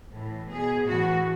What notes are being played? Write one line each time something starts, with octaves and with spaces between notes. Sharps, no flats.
A2 E3
B2 G#4
A2 E3 F#4